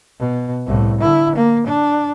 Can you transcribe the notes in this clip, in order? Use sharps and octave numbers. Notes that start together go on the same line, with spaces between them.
B2
C2 A2
D3 E4
A#3
D4